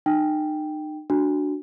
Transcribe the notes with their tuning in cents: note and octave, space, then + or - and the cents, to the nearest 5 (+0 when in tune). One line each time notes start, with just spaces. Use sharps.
D#4 -35 G5 +0
D4 +0 F#4 +0